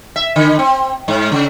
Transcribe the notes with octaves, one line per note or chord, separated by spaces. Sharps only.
E5
D3
C4
G#2
C#3